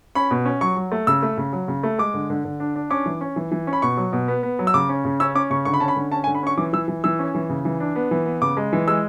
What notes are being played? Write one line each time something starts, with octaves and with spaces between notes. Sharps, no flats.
C#4 B5
B2
C#4
F#3 C#6
F#3
A3
C#3 E6
A3
C#3
F#3
C#3
A3
G#3 D6
D3
D3
D3
D4
D4
C#4 D6
E3
C#4
E3
E3
C#4
B5
B2 C#6
F#3
B2
B3
B3
F#3
E6
C#3 D6
C#4
C#3
C#4 E6
C#4 D6
C#3 C#6
D3 C#6
B5
C#4 A5
B5
D3
C#4 A5
G#5
D3
B5
C#4 C#6
E3 D6
E3 E6
E3
E3 E6
C#4
E3
C#3
E3
D4
B3
E3
B3
C#3 D6
G#3
E3
G#3 E6